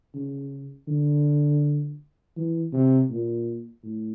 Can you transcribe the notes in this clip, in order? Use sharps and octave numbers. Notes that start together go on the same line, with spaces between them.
C#3
D3
E3
C3
A#2
A2